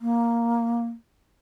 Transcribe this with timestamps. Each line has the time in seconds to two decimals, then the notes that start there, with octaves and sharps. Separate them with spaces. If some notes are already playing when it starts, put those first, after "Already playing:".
0.01 A#3